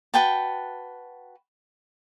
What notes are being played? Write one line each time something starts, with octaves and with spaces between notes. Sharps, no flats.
F#4 B4 G5 A5